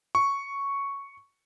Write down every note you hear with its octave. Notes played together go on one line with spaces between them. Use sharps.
C#6